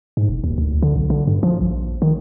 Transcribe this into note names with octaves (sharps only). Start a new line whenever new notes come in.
G#2
E1
D#2
D2
D3
B1
D3
G2
F3
A#1
D#3